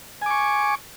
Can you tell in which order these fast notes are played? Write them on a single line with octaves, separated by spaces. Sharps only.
G#5 D6 C#6